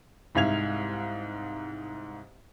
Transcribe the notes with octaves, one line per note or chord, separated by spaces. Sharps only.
C2 G#2 E5 F5 G#6 F7